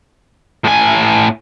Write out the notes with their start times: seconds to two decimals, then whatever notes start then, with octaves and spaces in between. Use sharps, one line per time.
0.65 A2 G#5